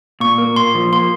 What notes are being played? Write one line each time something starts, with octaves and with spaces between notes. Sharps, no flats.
A#2 C#6
A#3
A#2 C6
F3
A#3 C6